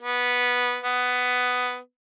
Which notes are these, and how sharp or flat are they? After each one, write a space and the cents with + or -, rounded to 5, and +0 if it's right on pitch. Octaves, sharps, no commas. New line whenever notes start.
B3 -5
B3 +10